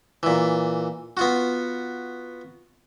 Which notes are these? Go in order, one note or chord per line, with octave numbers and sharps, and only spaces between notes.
A#2 E3
B3 F4 F#4